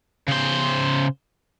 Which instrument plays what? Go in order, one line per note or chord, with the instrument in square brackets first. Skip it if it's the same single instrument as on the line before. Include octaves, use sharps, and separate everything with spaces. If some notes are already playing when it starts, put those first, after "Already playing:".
[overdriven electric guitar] C#3 C5